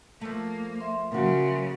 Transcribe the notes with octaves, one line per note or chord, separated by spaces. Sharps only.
F3 A3 A#3
E5 C6
C#3 F#3 A#3 F#4